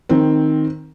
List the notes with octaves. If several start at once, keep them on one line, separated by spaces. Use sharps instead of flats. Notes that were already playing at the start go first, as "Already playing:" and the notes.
D#3 C4